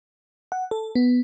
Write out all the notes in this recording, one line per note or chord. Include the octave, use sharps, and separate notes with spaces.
F#5
A4
B3